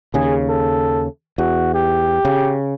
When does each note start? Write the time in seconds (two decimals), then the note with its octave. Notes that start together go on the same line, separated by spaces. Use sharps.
0.14 D#2 C#3 G#4
0.49 A4
1.38 E2 F#4
1.74 G4
2.25 C#3